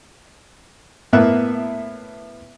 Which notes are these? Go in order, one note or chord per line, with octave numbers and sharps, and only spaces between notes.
A2 A#3 B3 E5 F#6